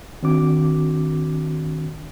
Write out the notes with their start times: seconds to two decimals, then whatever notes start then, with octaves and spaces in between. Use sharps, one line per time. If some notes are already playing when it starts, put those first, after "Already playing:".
0.23 D#3 C4 D4 F#4 D6